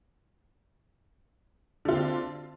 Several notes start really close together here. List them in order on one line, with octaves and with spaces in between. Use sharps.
D3 F4 C4